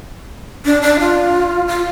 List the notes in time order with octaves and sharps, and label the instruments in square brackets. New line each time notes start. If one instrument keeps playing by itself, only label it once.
[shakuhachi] D4
D4
F4
F4